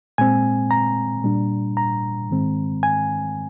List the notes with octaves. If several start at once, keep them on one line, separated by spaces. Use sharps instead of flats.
A#2 G#3 C4 G#5
A#5
A#2 G3 D4
A#5
G#2 D#3 G#3 C4
G#5